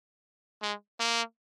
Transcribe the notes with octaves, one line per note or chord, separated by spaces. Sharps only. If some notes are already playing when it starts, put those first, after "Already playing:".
G#3
A#3